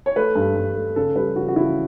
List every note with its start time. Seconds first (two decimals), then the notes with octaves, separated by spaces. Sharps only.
0.06 C#5
0.16 A3 B4
0.35 G2
0.56 G2
0.76 A3
0.96 C#3 A4
1.16 G3 B4
1.36 C#3 F#4
1.48 F#4
1.56 C#3 E4